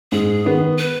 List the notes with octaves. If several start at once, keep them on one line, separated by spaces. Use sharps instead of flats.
G#2 G#4
D#3 B3
B4